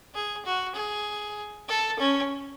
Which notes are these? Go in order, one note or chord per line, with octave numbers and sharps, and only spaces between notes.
G#4
F#4
G#4
A4
C#4